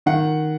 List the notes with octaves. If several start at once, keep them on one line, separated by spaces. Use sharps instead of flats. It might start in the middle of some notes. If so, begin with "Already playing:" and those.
D#3 F#5